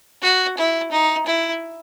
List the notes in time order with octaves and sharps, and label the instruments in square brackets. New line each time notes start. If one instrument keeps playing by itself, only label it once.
[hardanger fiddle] F#4
E4
D#4
E4